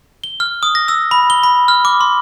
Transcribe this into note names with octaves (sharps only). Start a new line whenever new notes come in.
G7
F6
D#6
A#6
E6
B5
G7
B5
F6
D6
C6